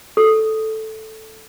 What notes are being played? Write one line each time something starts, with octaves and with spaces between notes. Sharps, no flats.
A4